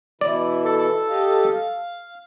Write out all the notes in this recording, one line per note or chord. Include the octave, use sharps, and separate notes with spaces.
B2 E3 E4 D5
A4
G4 D#5 F5
F5